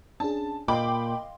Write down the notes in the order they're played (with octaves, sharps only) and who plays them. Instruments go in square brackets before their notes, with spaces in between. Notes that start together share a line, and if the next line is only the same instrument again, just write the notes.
[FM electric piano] C#4 D4 G#4 [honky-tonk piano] A5
[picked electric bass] A#2 [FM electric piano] D#5 F5 C6 [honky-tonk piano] G5 B5 D6